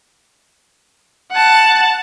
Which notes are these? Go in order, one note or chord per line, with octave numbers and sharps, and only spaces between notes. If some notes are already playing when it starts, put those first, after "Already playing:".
F#5 A5